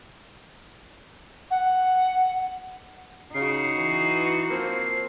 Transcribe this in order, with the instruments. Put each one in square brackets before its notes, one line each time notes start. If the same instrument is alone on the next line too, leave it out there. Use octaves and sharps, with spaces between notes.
[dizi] F#5
[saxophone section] C#3 [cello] D#4 F#4 [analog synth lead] C7
[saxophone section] E3
F3 A#3 C4